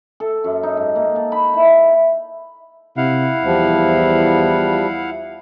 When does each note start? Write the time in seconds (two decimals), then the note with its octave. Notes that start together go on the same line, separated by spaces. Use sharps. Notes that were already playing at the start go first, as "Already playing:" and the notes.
0.20 A4
0.44 F#2
0.63 D#4
0.77 G#2
0.96 A#3
1.16 A5
1.32 B5
1.54 E4
2.97 C3 E4 F5 F#5
3.44 E2 F3 G3